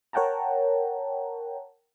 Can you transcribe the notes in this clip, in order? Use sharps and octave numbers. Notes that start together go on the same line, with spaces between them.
A#4 C#5 F#5 G5 A5 A#5